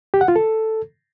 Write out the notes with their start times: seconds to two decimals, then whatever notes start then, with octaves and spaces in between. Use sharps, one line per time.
0.14 G4
0.21 F#5
0.28 F4
0.36 A4